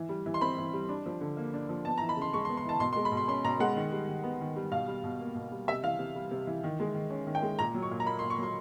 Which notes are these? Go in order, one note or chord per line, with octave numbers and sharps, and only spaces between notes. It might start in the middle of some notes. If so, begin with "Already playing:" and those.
Already playing: E3
G3
E3
C6
C4 B5
E3
G3
D4
F3
D3
A#3
D4
F3
B3 A5
E3 A#5
B5
C#3
C6
G#3 C#6
C6
B3
C6
E3 A5
B2 C6
C6
G#3
B5
B2
C6
C#4 C6
B2 A#5
G#3 F#5
D#3
G3
D#3
B3
D#3
G3
B2 F5
G3
B2
A#3
B2
G3
C3 E5
E3 F5
C3
G3
C3
E3
D#3
G#3
D#3
C#4
D#3
G5
G#3
A#2 A#5
F#3
C#6
A#2
A#5
A#3 B5
C6
A#2
C#6
F#3 C6